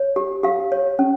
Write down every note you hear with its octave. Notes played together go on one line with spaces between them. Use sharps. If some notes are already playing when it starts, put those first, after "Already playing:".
Already playing: C#5
G4
G4 F5
C#5
C#4